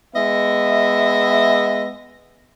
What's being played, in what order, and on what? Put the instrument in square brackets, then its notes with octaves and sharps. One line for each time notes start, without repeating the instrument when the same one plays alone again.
[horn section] G#3 B3 D#5 E5